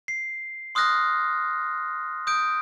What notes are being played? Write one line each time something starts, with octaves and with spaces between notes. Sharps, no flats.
C7
C6 D#6 F6 F#6 A#6
D#6 G6 D7